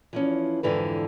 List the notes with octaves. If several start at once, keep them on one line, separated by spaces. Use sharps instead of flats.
E3 F3 C#4
F2 G#2 D3 E3 B4